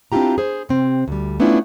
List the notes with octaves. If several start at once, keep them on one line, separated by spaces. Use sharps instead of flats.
C4 D4 E4 F4 G4 A#5
G#4 C5
C3 C4
D2 G3
A3 B3 C#4 D4 E4 F4